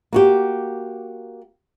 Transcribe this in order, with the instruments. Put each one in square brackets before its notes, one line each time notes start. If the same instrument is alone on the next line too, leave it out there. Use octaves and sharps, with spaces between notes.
[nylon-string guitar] A#3 F#4 G4